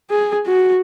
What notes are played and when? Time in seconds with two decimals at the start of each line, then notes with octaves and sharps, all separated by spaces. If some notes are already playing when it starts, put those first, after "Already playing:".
0.11 G#4
0.47 F#4